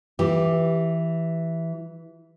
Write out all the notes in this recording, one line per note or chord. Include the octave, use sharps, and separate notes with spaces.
E3 G4